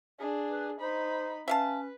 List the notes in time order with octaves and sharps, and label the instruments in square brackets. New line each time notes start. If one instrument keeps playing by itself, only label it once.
[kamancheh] D4 G#4
[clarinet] B4
[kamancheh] D#4 B5 [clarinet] C5
[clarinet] C#4 [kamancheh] B4 [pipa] E5 F5 A5